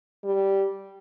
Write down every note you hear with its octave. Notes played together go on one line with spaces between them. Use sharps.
G3